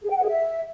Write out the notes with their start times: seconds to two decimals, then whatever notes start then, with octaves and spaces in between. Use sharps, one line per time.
0.03 G#4
0.09 G5
0.16 F#5
0.22 G#4
0.29 E5